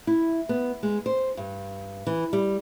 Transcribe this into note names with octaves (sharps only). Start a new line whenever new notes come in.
E4
B3
G#3
C5
G2
E3
G3